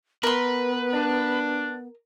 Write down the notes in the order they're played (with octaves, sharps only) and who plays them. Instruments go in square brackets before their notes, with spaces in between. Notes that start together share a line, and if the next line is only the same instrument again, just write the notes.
[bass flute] B3 [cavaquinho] A#4 C6 [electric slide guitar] B4
[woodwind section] D4